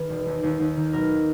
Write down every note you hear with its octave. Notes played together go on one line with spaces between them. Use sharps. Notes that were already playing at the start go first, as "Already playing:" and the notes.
Already playing: D#3 G#4 B4
E1
D#2
D#2
D#2
D#3
B1 A#4